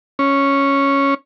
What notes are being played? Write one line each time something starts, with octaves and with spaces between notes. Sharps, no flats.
C#4